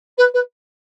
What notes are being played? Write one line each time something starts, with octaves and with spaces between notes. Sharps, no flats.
B4
B4